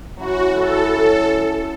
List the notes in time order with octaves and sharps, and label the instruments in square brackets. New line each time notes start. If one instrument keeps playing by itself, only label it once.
[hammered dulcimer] F#3 C#4 E4 [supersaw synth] F#4
[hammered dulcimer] F#3 C#4 E4 [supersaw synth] A4
[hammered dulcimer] F#3 C#4 E4 [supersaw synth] A4